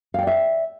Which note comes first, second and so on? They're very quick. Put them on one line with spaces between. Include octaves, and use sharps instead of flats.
F5 G5 D5 E5